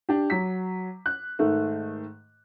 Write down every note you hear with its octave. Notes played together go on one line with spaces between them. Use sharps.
D4 G4
F#3 B6
F#6
G#2 D#3 A3